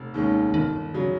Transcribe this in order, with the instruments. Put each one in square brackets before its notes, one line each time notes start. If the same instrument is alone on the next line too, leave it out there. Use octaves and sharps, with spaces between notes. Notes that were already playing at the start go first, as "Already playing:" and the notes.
Already playing: [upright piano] F1
D#2 D#3 G#3 C#4
[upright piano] G1 [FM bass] D#3
[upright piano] C#3 F#3